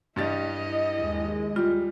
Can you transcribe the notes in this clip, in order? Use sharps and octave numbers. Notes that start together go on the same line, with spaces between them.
G2 G3 E4 D#5 A6
D#2 G#3
G3 F4